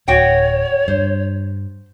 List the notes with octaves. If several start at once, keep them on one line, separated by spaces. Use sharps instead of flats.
D1 F#4 C#5 F#5 G5
G2 C5